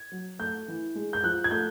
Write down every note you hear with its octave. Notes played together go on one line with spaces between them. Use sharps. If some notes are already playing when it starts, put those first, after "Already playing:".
Already playing: G#6
F#3
A3 G6
E3
G#3
G6
F3 F#6
G#6
A3 G6